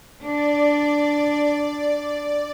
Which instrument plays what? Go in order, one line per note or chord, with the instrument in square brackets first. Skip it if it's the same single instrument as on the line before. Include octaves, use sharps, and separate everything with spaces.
[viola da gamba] D4 [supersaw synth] D5